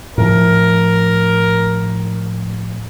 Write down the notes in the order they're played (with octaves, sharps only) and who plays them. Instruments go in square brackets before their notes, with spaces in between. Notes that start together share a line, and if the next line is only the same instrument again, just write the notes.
[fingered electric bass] A2 F3 [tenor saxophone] A#4